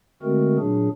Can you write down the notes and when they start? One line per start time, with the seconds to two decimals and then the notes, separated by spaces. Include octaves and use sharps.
0.23 D3 G#3 A3 C4 F#4 A#4
0.58 A#2 F#3 D4 G#4